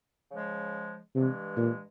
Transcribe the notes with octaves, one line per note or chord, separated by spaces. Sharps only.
C#3 F3 G#3
G2 C3 E3 G#3
A#2